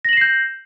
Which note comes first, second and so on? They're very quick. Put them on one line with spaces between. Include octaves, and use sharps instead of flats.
A#6 F#7 E7 C7 G6